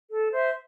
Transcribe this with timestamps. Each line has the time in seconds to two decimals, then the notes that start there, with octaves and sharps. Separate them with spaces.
0.10 A4
0.32 C5 E5